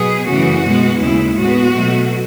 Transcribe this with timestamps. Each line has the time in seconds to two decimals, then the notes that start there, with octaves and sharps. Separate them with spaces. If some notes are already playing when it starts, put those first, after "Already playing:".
Already playing: B2 F#3 B3 G#4
0.27 F#2 C#3 E3 A3 F#4
0.64 B2 G#3 B3
1.00 D#2 C#3 G#3 E4
1.36 A2 G#3 B3 F#4
1.73 B2 F#3 A3